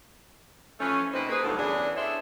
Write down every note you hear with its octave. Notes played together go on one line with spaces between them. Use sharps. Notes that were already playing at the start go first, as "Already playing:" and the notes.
E3 F3 A3 C#4
C3 A#3 D#4 B4 C5
A#3 G#4 B4
D2 G2 A#2 F#3 D#4 A4
E2 E3 C#4 D4 G#4
D4 G#4 A4 C5 C#5 E5